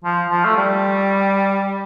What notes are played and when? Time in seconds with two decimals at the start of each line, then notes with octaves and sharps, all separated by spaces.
0.04 F3
0.30 F3
0.45 A3
0.57 G3